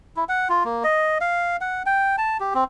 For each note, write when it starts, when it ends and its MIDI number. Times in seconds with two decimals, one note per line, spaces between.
0.16 0.24 64
0.29 0.48 78
0.49 0.63 65
0.64 0.83 58
0.84 1.18 75
1.21 1.56 77
1.61 1.83 78
1.86 2.16 79
2.18 2.37 81
2.40 2.53 67
2.54 2.64 60